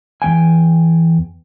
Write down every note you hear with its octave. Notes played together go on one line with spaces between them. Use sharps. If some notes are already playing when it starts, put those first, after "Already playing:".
E2 A3 G5 G#5